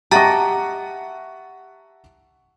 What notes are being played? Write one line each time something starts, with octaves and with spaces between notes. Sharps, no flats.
G4 D#5 E5 F#5 A5 A#5 C#6 A6